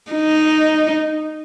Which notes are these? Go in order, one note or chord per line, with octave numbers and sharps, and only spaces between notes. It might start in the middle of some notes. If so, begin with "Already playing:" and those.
D#4